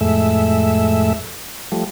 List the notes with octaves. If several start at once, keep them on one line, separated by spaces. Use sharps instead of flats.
F2 A2 G#3 A3 E5
F3 G3 A3